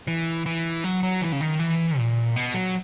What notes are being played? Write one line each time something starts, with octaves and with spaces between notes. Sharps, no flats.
E3
E3
F#3
F#3
E3
C#3
D#3
E3
A#2
B2
F#3